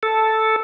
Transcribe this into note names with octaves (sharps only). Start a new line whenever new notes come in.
A4